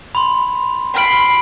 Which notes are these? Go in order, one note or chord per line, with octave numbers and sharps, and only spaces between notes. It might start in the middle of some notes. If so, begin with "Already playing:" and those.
B5 C6
B5 C6 F6 D7 F#7